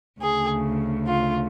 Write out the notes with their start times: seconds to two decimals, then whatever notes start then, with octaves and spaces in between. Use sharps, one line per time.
0.21 D2 C#3 G#4
1.08 F4